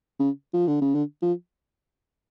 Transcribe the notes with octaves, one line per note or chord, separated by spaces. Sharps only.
C#3
F3
D3
C#3
D3
F3